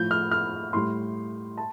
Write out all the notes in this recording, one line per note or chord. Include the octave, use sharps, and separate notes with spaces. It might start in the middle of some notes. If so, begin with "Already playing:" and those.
Already playing: A2 F3 G6
F6
F6
A2 G3 C6
A5